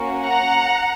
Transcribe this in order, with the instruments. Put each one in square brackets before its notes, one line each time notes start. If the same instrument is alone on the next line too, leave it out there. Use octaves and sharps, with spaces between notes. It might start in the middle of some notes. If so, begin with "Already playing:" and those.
Already playing: [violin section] A#3 C#4 F#4
F#5 A#5